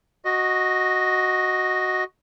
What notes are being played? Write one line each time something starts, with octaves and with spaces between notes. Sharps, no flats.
F#4 D#5